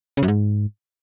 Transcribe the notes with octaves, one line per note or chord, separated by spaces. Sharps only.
C#3
F#2
G#2